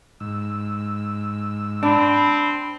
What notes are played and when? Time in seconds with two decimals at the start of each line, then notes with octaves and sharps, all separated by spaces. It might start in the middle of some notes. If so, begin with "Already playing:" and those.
0.20 G#2 E6
1.83 C4 D4 B5